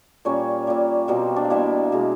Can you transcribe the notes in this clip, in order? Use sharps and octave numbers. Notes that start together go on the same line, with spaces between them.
A#2 G3 A#3 C#4 C#5
A#2 G3 A#3
B2 G3 A#3 C4 C5
D4 D5
F5
B2 G3 A#3 E4 E5
B2 G#3